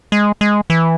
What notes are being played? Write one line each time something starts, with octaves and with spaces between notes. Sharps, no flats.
G#3
G#3
E3